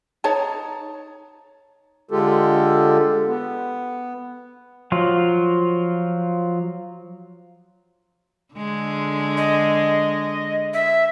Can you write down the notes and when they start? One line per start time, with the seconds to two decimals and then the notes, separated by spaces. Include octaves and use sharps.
0.24 D#4 C#5 A5 A#5
2.11 D3 G#3 F4 G4 A4
3.26 B3
4.92 F3 F#3 F4
8.54 D3 G#3
9.37 D#5
10.74 E5